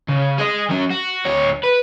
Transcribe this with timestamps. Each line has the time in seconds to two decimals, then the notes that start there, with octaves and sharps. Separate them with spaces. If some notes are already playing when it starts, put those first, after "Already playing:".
0.08 C#3
0.38 G#4 D#5
0.70 F#3 C#4
0.90 F#4
1.25 D2 C#5
1.63 B4